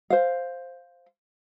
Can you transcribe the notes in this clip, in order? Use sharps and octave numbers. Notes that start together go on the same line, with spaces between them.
C5 F5